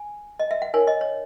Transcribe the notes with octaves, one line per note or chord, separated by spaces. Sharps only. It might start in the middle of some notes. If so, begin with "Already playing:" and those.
Already playing: G#5
D#5
E5
F#5
D#4 A#4 C#5 G#5
D#5
C#5